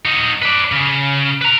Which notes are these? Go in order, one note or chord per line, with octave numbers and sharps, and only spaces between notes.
D#4 F#4
B4 D5
C#3
B4 A#5